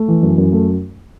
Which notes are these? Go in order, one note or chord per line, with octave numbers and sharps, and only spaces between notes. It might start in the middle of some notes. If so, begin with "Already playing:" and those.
Already playing: A3
E3
F#2
F#2
A3